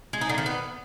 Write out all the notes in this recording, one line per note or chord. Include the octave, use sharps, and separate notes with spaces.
G#3
D#4
D3
D#3
B3